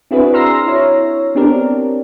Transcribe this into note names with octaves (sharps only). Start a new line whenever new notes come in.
C4 D4 E4 F#4 G#4 B4
A#5 C6 E6 F6 A#6 C7
E4 C#5
B3 C4 D4 G4 A#4